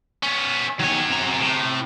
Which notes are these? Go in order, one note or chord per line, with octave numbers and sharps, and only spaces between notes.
B3 C#4
D#3 F#3 C#5 G#5
C3 A#5
A2